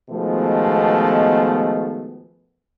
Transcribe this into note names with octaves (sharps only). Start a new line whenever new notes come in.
B2 D#3 F3 G#3 A3 B3